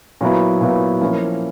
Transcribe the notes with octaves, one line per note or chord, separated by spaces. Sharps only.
A#2 F#3 B3 E4
A#2 F#3 B3 E4
F3 A#3 C#4 E4